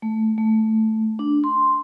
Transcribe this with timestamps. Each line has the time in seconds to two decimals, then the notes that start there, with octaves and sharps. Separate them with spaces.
0.02 A3
0.38 A3
1.19 D4
1.44 C6